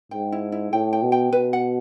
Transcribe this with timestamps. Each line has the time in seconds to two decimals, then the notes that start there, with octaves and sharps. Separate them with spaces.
0.11 G#2 G5
0.32 E4
0.52 E4
0.72 A2 G5
0.93 G5
1.02 B2
1.12 G5
1.33 B2 B4
1.53 F#5